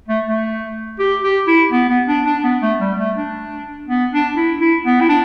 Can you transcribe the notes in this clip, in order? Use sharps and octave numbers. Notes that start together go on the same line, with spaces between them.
A3
A3
G4
G4
E4
B3
B3
D4
D4
B3
A3
G3
A3
D4
B3
D4
E4
E4
B3
E4
D4